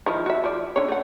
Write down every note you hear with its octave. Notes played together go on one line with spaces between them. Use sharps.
D#3 F3 E4
F#4 E5
F3 D5
D3 C#4 C#5
A3 F#5